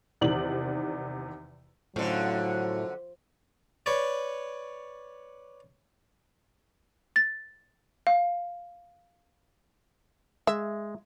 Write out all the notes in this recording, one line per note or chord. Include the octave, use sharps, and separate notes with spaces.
E2 C3 D#3 D5 D6 F#7
F#2 A2 D3 F3 F#3 A3
B4 C#5 D5
A6
F5
G#3 E5